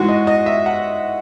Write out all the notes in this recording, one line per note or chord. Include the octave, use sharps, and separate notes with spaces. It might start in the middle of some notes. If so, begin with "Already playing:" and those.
Already playing: G#2 E3 G#3 F#4
D#5
D#5
E5
F#5